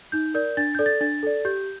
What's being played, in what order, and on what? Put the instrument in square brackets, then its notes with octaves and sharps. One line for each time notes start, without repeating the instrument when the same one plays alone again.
[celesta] D#4 G6
A#4 D5 G6
D4 A6
A4 D5 G6
A6
D4 A6
A4 D5
G4 G6